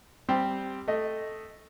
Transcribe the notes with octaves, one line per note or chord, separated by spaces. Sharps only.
G3 C4 G4
A3 D#5